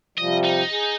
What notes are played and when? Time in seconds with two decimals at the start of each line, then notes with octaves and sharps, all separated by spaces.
0.18 C3 F3 G3 D#5
0.44 D#4
0.71 G#4